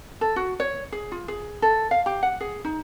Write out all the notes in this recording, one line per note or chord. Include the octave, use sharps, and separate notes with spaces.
A4
F#4
C#5
G#4
F4
G#4
A4
F5
G4
F#5
G#4
D#4